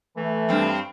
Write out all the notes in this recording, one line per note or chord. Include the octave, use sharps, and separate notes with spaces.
E3 A3
G2 C4